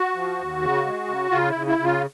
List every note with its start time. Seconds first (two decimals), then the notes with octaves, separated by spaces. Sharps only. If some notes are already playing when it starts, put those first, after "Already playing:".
Already playing: F#4
0.15 F3
0.38 D#2
0.62 C#3
0.86 G#3
1.08 C#3
1.31 C#3 F4
1.49 E4
1.55 C#3
1.67 E4
1.79 C#3
1.84 F4